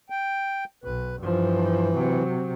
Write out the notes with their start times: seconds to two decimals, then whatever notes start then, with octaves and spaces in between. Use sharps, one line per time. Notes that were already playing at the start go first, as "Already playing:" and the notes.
0.10 G5
0.84 B1 B4
1.20 G2 E3 F3
1.96 C3 F#3